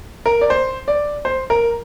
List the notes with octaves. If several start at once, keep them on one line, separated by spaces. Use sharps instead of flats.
A#4
D5
C5
D5
C5
A#4